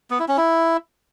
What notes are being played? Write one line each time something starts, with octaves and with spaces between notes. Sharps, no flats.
B3
E4
C#4
E4